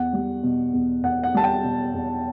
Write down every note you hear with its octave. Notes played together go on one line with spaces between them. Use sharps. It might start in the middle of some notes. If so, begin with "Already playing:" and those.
Already playing: E2 F#5
G3
B2
E2
E2 F#5
F#5
G3 A5
G5
B2
E2